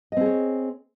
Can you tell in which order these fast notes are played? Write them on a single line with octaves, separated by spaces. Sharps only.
D#5 C4 G#4 C#5